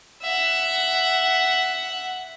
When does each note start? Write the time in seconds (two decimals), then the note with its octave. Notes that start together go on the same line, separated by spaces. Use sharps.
0.23 E5 F#5